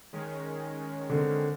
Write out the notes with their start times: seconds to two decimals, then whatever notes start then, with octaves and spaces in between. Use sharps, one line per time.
0.13 D#3 G#3 C#4
1.10 D3 C4